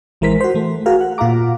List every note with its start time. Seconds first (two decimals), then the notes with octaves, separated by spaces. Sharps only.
0.21 A1 E3 G#3 A#4 C5 B6
0.40 F#4 C5
0.54 E3 A3
0.86 F#4 G#4 A#4 F5
1.01 F#5
1.18 A#2 F4 F5 F#5 A#5 D6